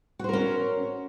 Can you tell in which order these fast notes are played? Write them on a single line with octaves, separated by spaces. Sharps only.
F#4 C5 A#4 C#4